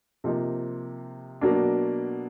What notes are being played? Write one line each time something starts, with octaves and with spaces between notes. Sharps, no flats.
C3 F3 A#3 D#4
B2 F#3 A#3 D4